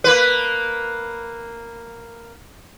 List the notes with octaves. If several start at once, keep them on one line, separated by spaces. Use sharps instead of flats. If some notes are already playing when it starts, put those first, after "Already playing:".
A#3 B4